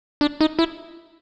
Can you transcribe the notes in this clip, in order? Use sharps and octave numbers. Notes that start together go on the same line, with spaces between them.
D4
D#4
E4